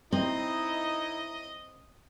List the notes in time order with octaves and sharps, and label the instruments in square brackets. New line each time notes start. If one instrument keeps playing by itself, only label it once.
[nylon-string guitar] C4 [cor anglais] D#4 [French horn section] E4 [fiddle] D#5